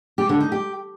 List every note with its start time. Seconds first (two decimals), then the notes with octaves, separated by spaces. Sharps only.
0.18 G4
0.29 D3
0.40 D#4
0.52 G4